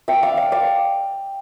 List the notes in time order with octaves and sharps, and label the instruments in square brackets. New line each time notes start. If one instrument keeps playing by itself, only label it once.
[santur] E5 G5
D5 F5
D5 F5
D5 F5